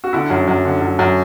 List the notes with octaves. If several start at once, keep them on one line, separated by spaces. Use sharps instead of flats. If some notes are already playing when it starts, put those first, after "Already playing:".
F#4
D3 E4
F#2
F#2
D3
F#2
F#2